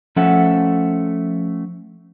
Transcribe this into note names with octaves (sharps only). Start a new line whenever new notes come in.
F3 A3 C#4 A4 E5 F#5